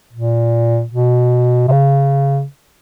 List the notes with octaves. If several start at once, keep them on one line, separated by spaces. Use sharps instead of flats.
A#2
B2
C3
C#3